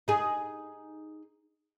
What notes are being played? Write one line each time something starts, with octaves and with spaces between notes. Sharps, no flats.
D#4 G#4